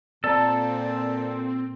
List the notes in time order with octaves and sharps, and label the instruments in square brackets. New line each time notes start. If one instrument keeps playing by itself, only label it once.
[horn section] A#2 [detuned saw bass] C4 [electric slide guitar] A4 [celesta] D5 A5 A#5